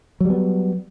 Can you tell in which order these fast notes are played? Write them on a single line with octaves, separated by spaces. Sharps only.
F#3 G3 B3